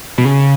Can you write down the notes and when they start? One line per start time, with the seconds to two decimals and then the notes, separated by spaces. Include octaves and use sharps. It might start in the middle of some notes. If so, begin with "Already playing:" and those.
0.18 B2
0.25 C#3